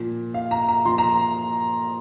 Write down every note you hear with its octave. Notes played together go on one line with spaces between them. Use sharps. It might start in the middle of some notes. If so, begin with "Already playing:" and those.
Already playing: A#2 F3
F5
A#5
A#5
A#2 F3 C6
A#5